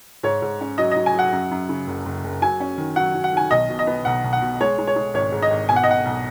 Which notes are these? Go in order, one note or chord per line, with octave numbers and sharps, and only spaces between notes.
G#2 C#5
G#2
C#4
F#3 D#5
F#3 D#5
G#5
F#3 F#5
F#2
F#2
C#3
F#1
F#1
F#1
F#3 G#5
C#4
D#3
F#3 F#5
F#3
F#5
D#3 G#5
B1 D#5
B2
D#5
B3
B1 F#5
B1
F#5
B2
G#3 C#5
G#3
C#5
G#3
G#1 C#5
G#2
D#5
G#1
B2 G#5
F#5
D#5
B1 F#5
B1